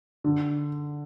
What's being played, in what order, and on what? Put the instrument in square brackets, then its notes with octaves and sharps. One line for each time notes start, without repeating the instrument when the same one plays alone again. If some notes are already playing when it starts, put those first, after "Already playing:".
[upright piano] D3